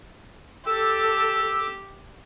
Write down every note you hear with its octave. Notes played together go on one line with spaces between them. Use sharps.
G4 A4 D6 E6